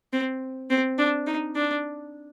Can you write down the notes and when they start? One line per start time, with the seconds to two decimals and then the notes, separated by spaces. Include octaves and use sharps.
0.13 C4
0.70 C4
0.98 D4
1.27 D#4
1.56 D4